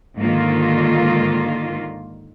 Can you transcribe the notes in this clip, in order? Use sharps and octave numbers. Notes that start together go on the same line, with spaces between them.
G#2 D3 D#3 A#3 F4